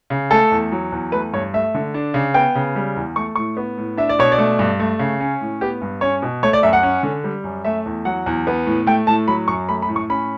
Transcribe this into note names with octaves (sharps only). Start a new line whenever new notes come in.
C#3
A3 A4
E2
F#3
E2
A3 B4
G2 C#5
A3 E5
D3
D4
C#3
B3 G5
C#3
G3
E2
A3 C#6
A2 C#6
B3
A2
D4 E5
D5
B2 C#5
D5
A3
G2
A3
C#3
C#4
A2
B3 G4
G2
C#4 C#5
B2
A3 C#5
D5
F#2 E5
F#5
C#4
D3
G3
F#2
A3 E5
E2
F#3 F#5
E2
B3
A2
A3 G5
A2 A5
F#3 B5
F#2 C#6
A3 B5
B5
A2
C#6
C#4 B5